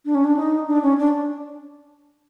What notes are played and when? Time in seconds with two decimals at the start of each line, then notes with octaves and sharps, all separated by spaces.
0.06 D4
0.15 C#4
0.24 D4
0.37 D#4
0.68 D4
0.82 C#4
0.98 D4